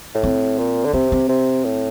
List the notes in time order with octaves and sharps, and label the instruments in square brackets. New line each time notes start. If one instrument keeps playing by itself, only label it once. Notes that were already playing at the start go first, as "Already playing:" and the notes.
[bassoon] A2
[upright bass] C4
[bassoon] A#2
D3
[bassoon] C3 [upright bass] C4
[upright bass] C4
[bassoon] C3
A2